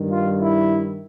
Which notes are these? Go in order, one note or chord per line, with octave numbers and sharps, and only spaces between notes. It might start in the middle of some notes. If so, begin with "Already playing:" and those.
Already playing: G2 D#3 G3
F4
E4